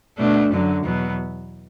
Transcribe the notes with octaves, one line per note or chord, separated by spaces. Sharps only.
B2 A3 D4
F#2 D3 F#3
E2 B2 F#3 B3